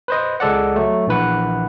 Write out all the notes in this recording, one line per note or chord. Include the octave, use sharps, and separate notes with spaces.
B4 C5 D#5
C#2 G#3 A4 D5 F#5
F#3 A3
A#1 E3 B4 F#5